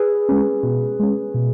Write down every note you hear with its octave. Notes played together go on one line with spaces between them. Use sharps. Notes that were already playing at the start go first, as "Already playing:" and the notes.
Already playing: G#4 B4
G#3 C#4
B2
G#3 C#4
B2